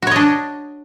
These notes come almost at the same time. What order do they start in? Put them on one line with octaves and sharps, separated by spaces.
F#4 C#5 D#5 D4